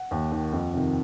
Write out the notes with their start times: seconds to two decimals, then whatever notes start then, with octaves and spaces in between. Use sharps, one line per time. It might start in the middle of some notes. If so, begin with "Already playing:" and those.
Already playing: F#5
0.11 D#2
0.32 D#3
0.53 F2
0.73 C3 D#3